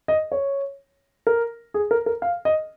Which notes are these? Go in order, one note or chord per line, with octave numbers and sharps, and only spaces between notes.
D#5
C#5
A#4
G#4
A#4
A#4
F5
D#5